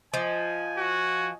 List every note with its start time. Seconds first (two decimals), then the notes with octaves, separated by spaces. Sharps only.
0.14 F3 D#5 G#5
0.78 F#4